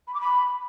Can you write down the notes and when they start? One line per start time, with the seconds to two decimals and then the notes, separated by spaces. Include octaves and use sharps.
0.07 B5
0.14 D6
0.21 B5